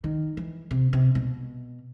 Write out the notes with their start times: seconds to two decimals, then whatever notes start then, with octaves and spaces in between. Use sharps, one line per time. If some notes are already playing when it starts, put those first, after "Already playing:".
0.04 D#3
0.37 E3
0.71 C3
0.93 C3
1.15 B2